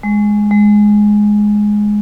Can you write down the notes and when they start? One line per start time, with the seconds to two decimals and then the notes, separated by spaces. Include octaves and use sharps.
0.03 G#3
0.51 G#3